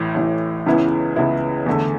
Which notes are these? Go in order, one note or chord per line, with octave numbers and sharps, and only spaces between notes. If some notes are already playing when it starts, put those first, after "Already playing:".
Already playing: A1 A2 E3
A1 A2 E3
C#2 C#3 E3 B3 E4
C#2 C#3 E3 B3 E4
E2 D3 A3